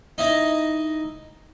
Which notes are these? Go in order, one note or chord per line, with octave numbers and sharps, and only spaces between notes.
D#4 E4 D#5